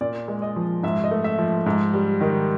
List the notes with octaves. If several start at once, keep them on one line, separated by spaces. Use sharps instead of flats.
A#2 D5
G#3
D#5
F3
G#2 E5
D#5
A3
E5
F3
G#2
G3
D#3